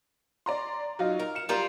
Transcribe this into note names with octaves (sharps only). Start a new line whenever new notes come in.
D5 A#5 C6
F#3 D#4 F4
A#4
C#7 E7
G3 F4 A#4